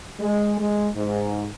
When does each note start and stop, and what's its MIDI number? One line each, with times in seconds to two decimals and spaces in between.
0.20 0.57 56
0.60 0.87 56
0.95 1.47 44